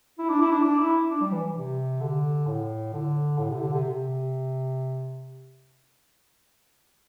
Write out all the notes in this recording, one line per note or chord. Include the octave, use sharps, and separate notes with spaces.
E4
D4
E4
D4
D4
E4
D4
G3
E3
C3
D3
A2
D3
A2
C3
D3
C3
C3